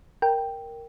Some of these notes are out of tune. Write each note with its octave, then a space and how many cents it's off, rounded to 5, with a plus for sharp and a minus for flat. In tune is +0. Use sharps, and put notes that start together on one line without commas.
A#4 +0 G5 +0